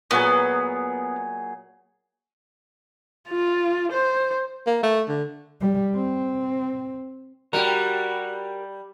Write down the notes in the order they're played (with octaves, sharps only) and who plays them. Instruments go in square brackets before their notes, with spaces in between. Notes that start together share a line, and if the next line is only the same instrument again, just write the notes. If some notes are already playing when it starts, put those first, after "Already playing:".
[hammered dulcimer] A#2 F#3 G#4 [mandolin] B3
[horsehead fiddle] F4
C5
[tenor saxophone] A#3
A3
D3
[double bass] G3
C4
[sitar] G3 [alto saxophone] F#4 [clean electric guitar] G4 A#4